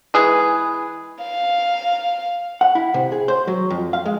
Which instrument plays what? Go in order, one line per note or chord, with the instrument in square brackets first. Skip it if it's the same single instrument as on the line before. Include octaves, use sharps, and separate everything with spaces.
[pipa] E3 G#3 G#4 B4
[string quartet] F5
[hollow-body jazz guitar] F#5
E4
C3
G#4
C5
F#3
F2
F5
G#3